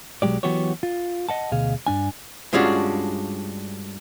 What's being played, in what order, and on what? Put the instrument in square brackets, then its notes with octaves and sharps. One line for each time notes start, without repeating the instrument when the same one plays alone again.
[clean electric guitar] B1 F#3 G#3 G4 D5
E3 F#3 B3 F#4 G4 C#5
F4
D#5 F#5 A5
D2 B2 G#4 F5
G2 D4 G#5
[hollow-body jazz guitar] G2 G#3 C#4 D4 F4 F#4